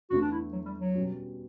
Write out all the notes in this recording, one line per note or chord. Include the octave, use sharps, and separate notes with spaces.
E2 D3 A3 F#4
D4
E4
F#3
G3
F#3
B2 G3 C#4